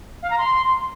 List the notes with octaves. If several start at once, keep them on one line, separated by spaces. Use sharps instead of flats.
F5
A#5
C6